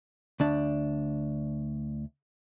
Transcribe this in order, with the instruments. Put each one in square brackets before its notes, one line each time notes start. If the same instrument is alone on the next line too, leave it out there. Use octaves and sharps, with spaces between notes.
[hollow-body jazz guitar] D2 D4